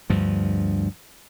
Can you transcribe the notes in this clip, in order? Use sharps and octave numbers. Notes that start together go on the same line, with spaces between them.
D2 G2 F3